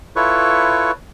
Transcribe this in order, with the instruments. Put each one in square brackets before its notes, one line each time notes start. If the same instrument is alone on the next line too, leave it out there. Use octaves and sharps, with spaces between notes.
[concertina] E4 F4 A4 B4 C#5 C#6